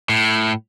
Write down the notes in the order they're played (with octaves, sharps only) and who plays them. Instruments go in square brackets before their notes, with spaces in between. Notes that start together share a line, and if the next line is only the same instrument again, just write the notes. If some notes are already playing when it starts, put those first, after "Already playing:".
[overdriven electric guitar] A2